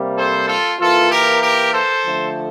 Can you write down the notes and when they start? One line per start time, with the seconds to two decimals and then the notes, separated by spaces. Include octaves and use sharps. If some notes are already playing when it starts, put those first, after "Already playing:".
Already playing: C3 G3 A#3
0.17 A4 C5
0.48 F4 A4
0.79 E3 A#3 F4 A4
1.11 G4 A#4
1.42 G4 A#4
1.73 A4 C5
2.04 D3 F3 A3